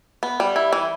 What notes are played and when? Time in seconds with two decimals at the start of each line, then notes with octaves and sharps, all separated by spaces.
0.23 B3
0.40 G3
0.56 E4
0.73 E3